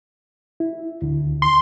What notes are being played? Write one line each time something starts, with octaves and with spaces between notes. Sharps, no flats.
E4
D2 D3
C6